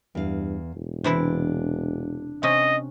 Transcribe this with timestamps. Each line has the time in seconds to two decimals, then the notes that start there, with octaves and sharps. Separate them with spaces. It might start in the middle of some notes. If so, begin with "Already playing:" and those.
0.15 E2 G2 F5
0.75 E1
1.04 C3 E3 D4 E4
2.43 C3 C#4 D#5